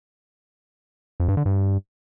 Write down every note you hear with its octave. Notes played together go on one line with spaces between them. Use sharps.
F2
G2
D3
G2